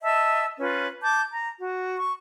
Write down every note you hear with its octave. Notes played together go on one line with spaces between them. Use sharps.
D#5 E5 A5 E6
C#4 F4 B4
A5 D6 G6
A#5
F#4
C#6